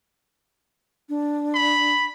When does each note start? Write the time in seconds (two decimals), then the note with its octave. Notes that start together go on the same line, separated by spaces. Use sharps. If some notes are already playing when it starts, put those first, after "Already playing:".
1.09 D4
1.54 B5